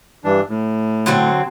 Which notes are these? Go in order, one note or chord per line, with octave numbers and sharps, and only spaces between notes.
G2 E3 D4
A2
D3 F#3 C4